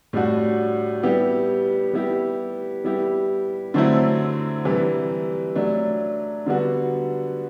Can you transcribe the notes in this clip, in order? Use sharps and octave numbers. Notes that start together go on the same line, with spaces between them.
A2 G3 D4 F#4
G3 B3 E4 G4
G3 B3 E4 G4
G3 B3 E4 G4
D3 F#3 A3 C4 E4
C3 E3 G3
F#3 A3 D4
D3 G3 B3 F#4